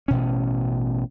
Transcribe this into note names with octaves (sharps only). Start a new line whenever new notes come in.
A1 B2 C#4